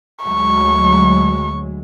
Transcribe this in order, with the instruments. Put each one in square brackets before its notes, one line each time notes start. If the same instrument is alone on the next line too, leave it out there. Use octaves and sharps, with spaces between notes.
[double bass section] D2 F#3 G#3 [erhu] C#6